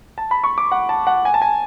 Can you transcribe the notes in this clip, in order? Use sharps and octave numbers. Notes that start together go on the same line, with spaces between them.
A5
B5
C#6
D6
F#5
A5
F#5
G#5
A5
G#5